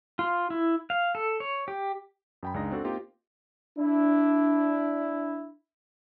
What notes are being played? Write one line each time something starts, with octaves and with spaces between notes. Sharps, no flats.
F4
E4
F5
A4
C#5
G4
F#2 G5 B5
C#2 G#3 D4 D#4 A#6
C4 D4 F#4 A4
A#3 C4 D#4 F4 G4 A#4
D4 E4